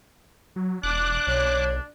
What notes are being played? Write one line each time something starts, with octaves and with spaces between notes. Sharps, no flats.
F#3
E1 D4 D6 F#6
B1 C#5